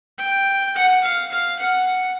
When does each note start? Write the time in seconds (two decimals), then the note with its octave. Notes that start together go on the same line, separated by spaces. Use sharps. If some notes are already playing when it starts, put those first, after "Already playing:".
0.18 G5
0.76 F#5
1.03 F5
1.31 F5
1.59 F#5